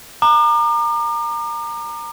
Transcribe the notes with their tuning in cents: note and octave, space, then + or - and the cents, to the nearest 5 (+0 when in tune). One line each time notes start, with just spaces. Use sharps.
A#5 -5 D6 +40